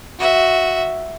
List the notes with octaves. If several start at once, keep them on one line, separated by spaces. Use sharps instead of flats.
F#4 E5